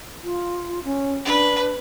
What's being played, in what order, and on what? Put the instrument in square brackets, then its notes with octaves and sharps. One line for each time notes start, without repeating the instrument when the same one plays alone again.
[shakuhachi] F4
C#4
[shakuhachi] D4 [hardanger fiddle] B4